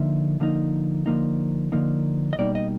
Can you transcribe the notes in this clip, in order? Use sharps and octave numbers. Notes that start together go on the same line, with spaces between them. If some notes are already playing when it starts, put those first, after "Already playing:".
Already playing: D3 F3 A#3 D#4 E5
D3 F3 A#3 D#4
D3 F3 A#3 D#4
D3 F3 A#3 D#4
D#5
B2 G3 A#3 D#4 D5
D#5